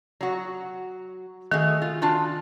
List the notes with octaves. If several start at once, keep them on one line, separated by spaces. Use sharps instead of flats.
F#3 F#4
D#3 A3 F#4 G#4
F4
D4 F4 F#4